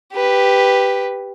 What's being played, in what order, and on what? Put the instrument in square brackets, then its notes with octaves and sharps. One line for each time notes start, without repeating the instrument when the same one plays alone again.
[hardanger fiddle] G4 B4